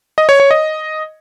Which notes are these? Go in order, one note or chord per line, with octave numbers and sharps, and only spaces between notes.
D#5
C#5
C#5
D#5